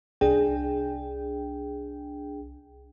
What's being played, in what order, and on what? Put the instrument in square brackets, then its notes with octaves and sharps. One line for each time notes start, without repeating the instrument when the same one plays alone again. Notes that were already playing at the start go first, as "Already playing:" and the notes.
[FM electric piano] C2 D4 G#4 G5